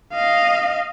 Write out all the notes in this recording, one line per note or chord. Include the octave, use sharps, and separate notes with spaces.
D#5 F5